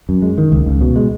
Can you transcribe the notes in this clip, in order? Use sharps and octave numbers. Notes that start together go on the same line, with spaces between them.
F#2
G#3
D#3
C#2
C#2
B2
G#3